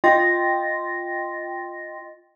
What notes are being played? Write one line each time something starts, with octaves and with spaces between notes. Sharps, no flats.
F4 D#5 G5 C6 A6 A#6